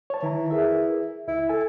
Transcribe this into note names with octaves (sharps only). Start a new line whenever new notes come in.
C#5 A5
D#3 E3 A#5
G#4 A#4 E5
C#2 E4
A4 G#5